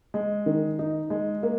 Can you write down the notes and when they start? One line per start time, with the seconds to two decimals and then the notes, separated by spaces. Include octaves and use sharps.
0.14 G#3
0.46 D#3
0.79 D#4
1.10 G#3
1.43 A#3